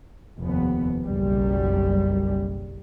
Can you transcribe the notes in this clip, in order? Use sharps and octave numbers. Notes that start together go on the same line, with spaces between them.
F1 D#2 B3
F#1 B1 F#2 G3